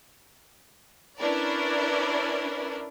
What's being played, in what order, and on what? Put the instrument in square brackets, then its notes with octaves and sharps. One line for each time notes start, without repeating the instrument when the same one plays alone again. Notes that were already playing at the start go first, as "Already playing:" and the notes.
[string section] C#4 D4 E4 A#4 B4 D5